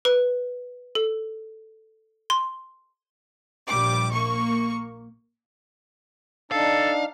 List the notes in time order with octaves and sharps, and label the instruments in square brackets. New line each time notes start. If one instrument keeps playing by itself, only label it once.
[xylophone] B4
A4
C6
[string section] A#1 G3 D6
A#3 C#6
[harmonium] D4 D#4 [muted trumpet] A4 [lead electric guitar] F5